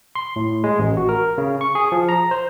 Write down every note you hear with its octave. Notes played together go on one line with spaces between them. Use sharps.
C6
A2
G#3
A1
F#4
A#4
C#3
C#6
G#4
F3
A#5
C5